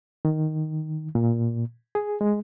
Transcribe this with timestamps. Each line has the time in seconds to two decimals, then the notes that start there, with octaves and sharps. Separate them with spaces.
0.25 D#3
1.15 A#2
1.95 G#4
2.21 G#3